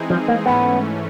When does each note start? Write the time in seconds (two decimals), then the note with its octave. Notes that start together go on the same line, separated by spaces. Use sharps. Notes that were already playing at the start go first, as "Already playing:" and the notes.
Already playing: E3 G#3 C4 D#4 G#4
0.10 F3
0.28 A#3
0.46 G#2 E3 A3 B3 C#4